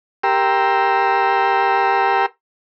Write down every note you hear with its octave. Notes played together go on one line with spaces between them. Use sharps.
G4 A#4 G5 A#5 C6 E6